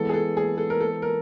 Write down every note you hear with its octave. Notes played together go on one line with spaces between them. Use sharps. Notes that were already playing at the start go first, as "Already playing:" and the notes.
Already playing: E3 G#3 B3 A4
G#4
A4
G#4
A4
A#4
A4
A#4